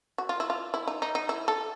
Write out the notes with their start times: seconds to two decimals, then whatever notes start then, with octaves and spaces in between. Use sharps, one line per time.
0.18 F#4
0.29 F4
0.40 E4
0.50 F4
0.74 E4
0.87 D#4
1.02 D#4
1.15 D#4
1.29 E4
1.48 A4